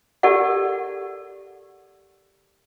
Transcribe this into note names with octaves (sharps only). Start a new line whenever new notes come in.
G4 A4 A#4 D5 F#5